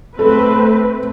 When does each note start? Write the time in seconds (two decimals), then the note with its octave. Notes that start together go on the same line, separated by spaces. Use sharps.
0.19 A3 C4 A4 B4